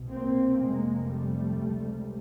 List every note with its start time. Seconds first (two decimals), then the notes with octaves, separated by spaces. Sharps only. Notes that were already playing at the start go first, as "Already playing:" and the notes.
Already playing: C2 B2
0.10 A#3 C4
0.58 F1 F2 C3 G#3 A#3
1.08 G3 A3
1.57 C#2 C3